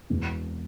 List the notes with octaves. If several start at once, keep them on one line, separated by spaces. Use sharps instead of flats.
E1 E2 B2